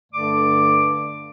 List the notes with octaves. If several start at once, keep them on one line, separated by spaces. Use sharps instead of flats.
G2 D3 A3 D5 D6